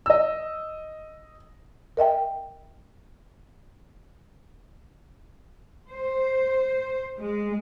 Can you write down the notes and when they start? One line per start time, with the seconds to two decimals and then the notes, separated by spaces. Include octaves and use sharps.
0.06 D#5 E6
1.97 A#4 D#5 E5 G5
5.92 C5
7.18 G#3